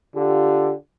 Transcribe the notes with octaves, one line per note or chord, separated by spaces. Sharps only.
D3 F4 G4